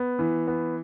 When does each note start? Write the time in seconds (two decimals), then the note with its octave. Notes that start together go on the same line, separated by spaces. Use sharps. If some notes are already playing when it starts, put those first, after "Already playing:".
Already playing: B3
0.19 E3
0.47 B3